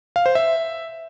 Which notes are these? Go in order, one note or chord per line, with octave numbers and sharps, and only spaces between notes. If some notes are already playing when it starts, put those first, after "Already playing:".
F5
C5
E5